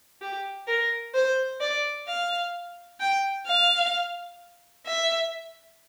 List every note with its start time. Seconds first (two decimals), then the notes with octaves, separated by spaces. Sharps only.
0.21 G4
0.67 A#4
1.14 C5
1.61 D5
2.07 F5
3.00 G5
3.47 F5
4.86 E5